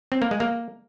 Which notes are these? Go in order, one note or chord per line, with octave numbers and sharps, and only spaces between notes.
C4
A#3
G#3
A#3